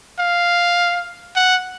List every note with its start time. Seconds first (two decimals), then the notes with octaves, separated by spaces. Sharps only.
0.19 F5
1.36 F#5